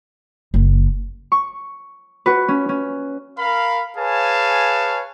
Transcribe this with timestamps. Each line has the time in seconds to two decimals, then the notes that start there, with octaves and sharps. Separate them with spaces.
0.54 F#1
1.32 C#6
2.26 F#4 B4
2.48 C#4
2.69 C#4
3.39 A#4 F5 B5
3.97 G#4 B4 C#5 F5 G#5 A5